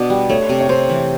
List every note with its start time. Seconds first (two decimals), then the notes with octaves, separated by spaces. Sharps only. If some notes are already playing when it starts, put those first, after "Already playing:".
Already playing: B2 D4
0.10 G3
0.29 A3 C#5
0.49 C3
0.60 C#5
0.69 C3 C5
0.90 E3